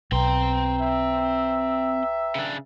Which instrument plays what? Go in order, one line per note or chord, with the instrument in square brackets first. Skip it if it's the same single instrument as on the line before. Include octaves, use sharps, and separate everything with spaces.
[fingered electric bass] B1 [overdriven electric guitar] C4 C6 [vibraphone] B4 G5 A#5
[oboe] E5
[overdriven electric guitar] C#3 D4